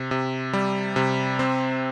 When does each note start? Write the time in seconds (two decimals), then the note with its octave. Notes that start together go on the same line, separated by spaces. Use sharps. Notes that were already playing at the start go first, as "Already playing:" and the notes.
Already playing: C3
0.11 C3
0.53 G3
0.96 C3
1.39 C4